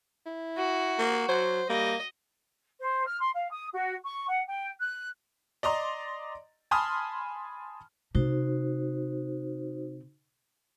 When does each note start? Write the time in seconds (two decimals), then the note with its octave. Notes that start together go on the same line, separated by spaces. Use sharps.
0.26 E4
0.57 F#4
0.99 A#3
1.28 F#3 C5
1.69 G3 A#3 D#5
2.80 C5
3.06 F6
3.19 C6
3.34 F5
3.51 D#6
3.72 F#4
4.04 C#6
4.28 F#5
4.46 G5
4.79 F#6
5.63 D5 D#5 A#5 C6
6.71 G#5 A5 B5 C6 D#6 F6
8.15 C3 D#4 F#4 C5